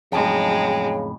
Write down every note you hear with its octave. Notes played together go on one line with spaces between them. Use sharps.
F2 A2 C#3 F#3 G#3 D#4 G5